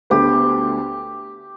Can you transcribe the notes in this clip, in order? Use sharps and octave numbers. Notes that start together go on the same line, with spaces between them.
D2 D3 B3 G4